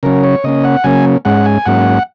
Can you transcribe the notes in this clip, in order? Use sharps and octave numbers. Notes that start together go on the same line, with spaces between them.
C#3 F#3 C#4 A#4
C#5
C#3 A#3 C#4 D#5
F#5
C#3 F#3 A#3 C#4 G#5
G#2 G#3 C#4 F#5
G#5
G#2 F#3 A#3 C#4 F#5